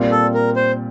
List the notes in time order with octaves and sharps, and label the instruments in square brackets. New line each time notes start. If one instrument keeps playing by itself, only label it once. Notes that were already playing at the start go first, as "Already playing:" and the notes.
Already playing: [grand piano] A#2 G3 C4
[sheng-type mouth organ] A4
A#4
C5